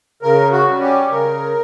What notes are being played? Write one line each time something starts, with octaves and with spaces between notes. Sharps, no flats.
C#3 A#4
F#4
G3 C#4
G4
C#3 A#4